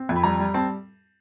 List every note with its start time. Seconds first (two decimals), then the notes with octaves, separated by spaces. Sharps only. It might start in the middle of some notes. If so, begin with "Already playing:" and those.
Already playing: C4
0.09 F2
0.16 B5
0.24 G3 A#5
0.40 G3
0.54 C4 A5